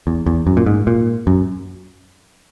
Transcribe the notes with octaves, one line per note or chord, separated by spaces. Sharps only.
E2
E2
F#2
A#2
G#2
A#2
F#2